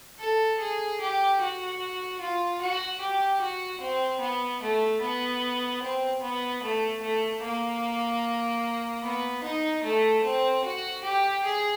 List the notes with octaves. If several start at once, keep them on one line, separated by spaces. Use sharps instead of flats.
A4
G#4
G4
F#4
F4
F#4
G4
F#4
C4
B3
A3
B3
C4
B3
A3
A3
A#3
B3
D#4
A3
C4
F#4
G4
G#4